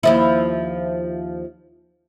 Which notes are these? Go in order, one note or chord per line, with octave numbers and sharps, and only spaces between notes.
D#2 F3 E4